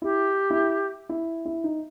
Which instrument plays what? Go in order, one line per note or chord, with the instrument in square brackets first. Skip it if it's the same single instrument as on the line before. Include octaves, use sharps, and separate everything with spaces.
[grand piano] E4 [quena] G4
[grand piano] E4
E4
E4
D#4